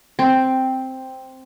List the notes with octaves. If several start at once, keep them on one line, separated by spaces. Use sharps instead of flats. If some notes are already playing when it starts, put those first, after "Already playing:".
C4